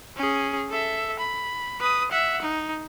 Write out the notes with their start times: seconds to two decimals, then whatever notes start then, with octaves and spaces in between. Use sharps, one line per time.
0.17 C#4 G#4
0.70 A4 E5
1.19 B5
1.81 B4 D#6
2.11 E5 F#5
2.42 D#4